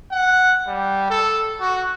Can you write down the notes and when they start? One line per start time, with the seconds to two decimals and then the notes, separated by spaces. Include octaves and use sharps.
0.12 F#5
0.67 G3
1.10 A4
1.60 F#4